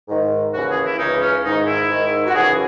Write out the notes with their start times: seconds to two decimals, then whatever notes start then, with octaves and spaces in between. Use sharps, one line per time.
0.08 G#2 D#3
0.54 D#2 C#3 E3 F#4
0.69 G#4
0.84 E4
0.99 C#2 C#3 E3 D#4
1.22 C#4
1.45 G#2 D#3 D#4
1.67 E4
1.89 G#2 D#3
2.27 F#4
2.35 F#2 C#3 E3 G#4